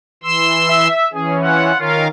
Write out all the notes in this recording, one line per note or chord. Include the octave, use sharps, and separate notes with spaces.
E3 C6 E6
E5
E3 C#4 G#4
E4 F4 F#5
D#3 C#4 F4 A#4 F5